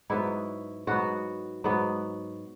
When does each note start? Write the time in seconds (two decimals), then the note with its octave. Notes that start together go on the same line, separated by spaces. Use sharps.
0.10 G#2 F#3 B3 E4
0.87 G#2 F#3 B3 F#4
1.64 G#2 F#3 B3